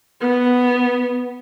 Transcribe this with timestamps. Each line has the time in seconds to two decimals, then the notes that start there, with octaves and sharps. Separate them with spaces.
0.21 B3